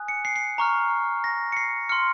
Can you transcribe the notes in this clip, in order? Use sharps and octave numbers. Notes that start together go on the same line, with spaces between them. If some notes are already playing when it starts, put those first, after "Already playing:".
Already playing: G#5 D#6 F#6
C#7
C7
C7
A#5 C#6 F6
A#6
C#7
C7
C6 F6 C#7